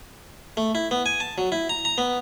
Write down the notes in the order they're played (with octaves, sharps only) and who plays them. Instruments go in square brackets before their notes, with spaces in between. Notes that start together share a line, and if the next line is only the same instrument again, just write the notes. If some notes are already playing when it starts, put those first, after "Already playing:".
[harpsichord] A3
E4
B3
G#5
A5
F#3
E4
A#5
A#5
B3